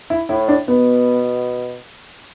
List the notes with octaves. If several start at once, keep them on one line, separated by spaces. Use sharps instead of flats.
E4
A2 E4
D4
B2 B3